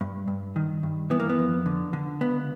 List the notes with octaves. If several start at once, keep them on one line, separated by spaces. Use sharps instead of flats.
G2
G2
D#3
G2
E3 B3
A#3
B3
F2
D3
D3
C#2 B3